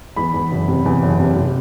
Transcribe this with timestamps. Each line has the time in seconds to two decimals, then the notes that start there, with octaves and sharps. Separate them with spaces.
0.16 E2 B5
0.34 E2
0.52 F#1
0.68 C3
0.85 E2
1.03 F#1
1.20 C3
1.36 C3